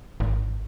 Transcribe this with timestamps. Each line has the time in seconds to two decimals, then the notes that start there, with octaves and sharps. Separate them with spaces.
0.20 G#1